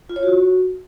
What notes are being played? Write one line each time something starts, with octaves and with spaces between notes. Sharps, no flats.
F4
C#5
F#4